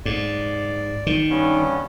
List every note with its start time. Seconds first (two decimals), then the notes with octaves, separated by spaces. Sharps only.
0.05 G#2 D5
1.07 D#3
1.30 G2 B3 C#4